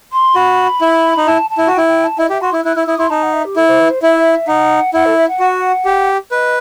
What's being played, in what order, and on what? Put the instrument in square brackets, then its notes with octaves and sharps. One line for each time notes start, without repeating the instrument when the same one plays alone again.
[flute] C6
[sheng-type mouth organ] F#4 [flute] B5
[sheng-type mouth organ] E4
D#4
[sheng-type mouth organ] E4 [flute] A5
[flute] A5
[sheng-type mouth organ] E4
F#4
[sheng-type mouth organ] E4 [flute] G5
[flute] G5
A5
[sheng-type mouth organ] E4 [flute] D#5
[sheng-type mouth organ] G4 [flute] E5
[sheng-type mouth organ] F#4 [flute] C6
[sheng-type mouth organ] E4 [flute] E6
[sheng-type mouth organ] E4 [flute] F#6
[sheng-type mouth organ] E4 [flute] E6
[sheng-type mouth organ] E4 [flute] D#6
[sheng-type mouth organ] E4 [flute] C6
[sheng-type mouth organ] D#4 [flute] A5
[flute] F#5
E5
G4
[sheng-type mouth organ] E4 [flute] A4
[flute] C5
B4
C5
[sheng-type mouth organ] E4 [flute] E5
[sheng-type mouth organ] D#4 [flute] F#5
[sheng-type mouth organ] E4 [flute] F#5
[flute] A4
E5
F#5
[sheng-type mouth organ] F#4
G4
[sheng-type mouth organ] B4 [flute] D#5